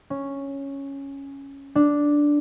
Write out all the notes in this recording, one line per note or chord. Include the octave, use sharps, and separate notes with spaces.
C#4
D4